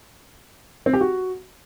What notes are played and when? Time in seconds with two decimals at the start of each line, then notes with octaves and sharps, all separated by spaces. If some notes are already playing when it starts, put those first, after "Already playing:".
0.86 C4
0.93 G4
1.01 F#4